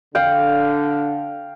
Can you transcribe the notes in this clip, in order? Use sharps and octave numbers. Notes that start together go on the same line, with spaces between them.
D3 F5 G5